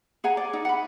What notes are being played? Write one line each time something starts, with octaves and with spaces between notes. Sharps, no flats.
G#4 F#5 G#5 A#5
D5
D#4
F#5 B5